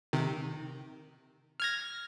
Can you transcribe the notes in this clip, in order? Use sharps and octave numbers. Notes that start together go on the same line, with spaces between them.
C3 D#3
F6 G#6 A#6